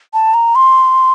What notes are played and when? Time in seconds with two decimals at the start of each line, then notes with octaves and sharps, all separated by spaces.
0.14 A5
0.34 A#5
0.55 C6